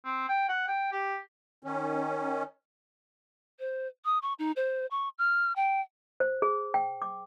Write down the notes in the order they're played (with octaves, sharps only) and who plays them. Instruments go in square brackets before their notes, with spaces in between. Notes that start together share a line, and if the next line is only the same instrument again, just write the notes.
[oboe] C4
G5
F#5
G5
G4
[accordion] D#3 C#4
[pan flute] C5
D#6
C#6
D#4
C5
C#6
F6
G5
[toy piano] C5
G#4
G5
D6